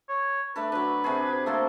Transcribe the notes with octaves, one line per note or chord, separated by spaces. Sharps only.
C#5
A3 D4 A4 B4
D3 F#3 B4
C3 D4 G#4
B4
A3 A#3 C4 A4